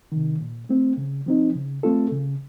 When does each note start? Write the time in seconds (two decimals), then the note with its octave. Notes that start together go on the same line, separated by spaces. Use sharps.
0.12 C3 D#3
0.41 A#2
0.69 A3 C4
0.97 C#3
1.26 F3 C4 D#4
1.55 C#3
1.83 A3 C4 F4 A4
2.11 C#3